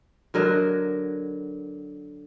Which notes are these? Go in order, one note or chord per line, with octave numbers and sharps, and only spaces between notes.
D3 F#3 A#4 D#5